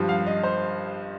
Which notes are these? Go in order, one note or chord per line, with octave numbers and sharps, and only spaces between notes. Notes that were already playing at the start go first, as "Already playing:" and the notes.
Already playing: G2 F3
F5
D#5
C5